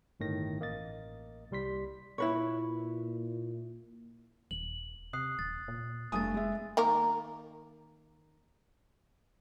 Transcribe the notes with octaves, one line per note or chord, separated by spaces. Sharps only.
G1 A2 D#3 A#6
A1 A#3 D#5 A6
C2 G3 C6 B6
A#2 E4 B4 C#5
D#1 F#7
C3 D#6 F#6 C7
D#1 A6
A#2
F1 G2 A3 G#5 D#6 A6
G#3 E5
D#3 A#3 A#4